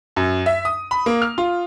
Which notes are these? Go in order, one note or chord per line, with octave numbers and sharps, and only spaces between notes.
F#2
E5
D#6
B5
A#3
F6
F4